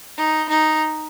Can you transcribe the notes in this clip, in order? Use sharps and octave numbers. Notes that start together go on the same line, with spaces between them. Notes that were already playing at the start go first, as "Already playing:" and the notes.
D#4
D#4